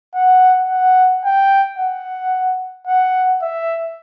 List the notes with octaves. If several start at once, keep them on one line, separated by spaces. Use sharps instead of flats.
F#5
F#5
G5
F#5
F#5
E5